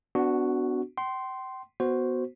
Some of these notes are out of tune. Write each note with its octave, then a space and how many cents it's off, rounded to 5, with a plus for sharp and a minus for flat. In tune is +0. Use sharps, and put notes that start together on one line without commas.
B3 +30 D4 +0 F#4 +0
G5 -40 C6 +0
B3 +0 F#4 +0 C5 +0